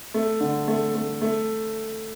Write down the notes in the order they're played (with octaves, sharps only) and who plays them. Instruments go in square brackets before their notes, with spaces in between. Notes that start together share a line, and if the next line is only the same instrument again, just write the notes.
[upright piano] A3
D3
A3
A3
A3